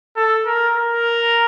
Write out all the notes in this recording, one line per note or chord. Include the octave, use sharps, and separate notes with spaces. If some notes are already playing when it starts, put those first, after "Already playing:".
A4
A#4
A#4